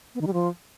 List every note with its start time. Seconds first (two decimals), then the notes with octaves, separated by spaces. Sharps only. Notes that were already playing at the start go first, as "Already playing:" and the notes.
0.15 B3
0.21 D#3
0.27 G3
0.33 F3